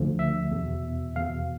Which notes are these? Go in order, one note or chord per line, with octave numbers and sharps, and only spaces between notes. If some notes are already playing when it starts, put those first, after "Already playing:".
Already playing: D2 D3 F3
E5
E2 B2
E2 B2 F5